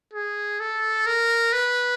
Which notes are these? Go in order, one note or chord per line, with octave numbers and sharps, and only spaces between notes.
G#4
A4
A#4
B4